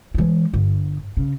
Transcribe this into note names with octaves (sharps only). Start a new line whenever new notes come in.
E3 G#3
G1
C#3